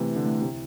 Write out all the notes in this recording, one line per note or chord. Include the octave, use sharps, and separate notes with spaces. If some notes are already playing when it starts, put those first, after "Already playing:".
Already playing: C3 E3 A3 B4
E4
D3
A3
C3 E4